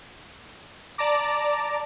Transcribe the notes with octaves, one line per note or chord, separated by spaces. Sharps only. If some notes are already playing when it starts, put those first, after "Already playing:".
D5 A5 A#5 D6